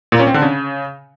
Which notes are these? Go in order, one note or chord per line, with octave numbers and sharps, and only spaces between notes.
A#2
C#4
C4
D3
C#3